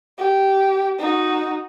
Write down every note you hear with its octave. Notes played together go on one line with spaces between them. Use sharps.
G4
D#4 F#4